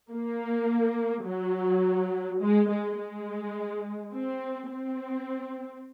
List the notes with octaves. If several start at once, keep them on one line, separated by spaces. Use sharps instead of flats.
A#3
F#3
G#3
G#3
G#3
C4
C4